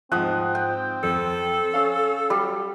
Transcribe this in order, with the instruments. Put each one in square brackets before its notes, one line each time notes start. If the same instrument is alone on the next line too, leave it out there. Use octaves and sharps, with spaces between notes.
[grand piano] G#2 F3 [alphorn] C4 [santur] F#5 D#6
[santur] G5
[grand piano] F2 [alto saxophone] A4
[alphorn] C#4 [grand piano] F5
[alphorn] F#3 [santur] G3